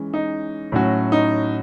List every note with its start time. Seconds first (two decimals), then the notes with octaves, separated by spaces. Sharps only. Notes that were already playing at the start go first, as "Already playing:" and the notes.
Already playing: E3 G#3 C#4
0.14 D#4
0.72 A2 F#3 C#4 F#4
1.12 D#4